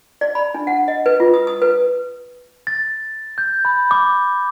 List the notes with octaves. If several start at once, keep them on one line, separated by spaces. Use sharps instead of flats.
D5
B5
D4
F#5
D#5
B4
F4
D#6
D#6
B4
A6
G6
B5
D6